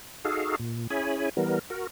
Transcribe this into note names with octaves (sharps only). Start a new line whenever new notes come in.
D#4 F#4 G#4 A4 F5
A#2
C#4 E4 G#4 C#5 G#5 B5
E3 G3 B3 A#4
F#4 A#4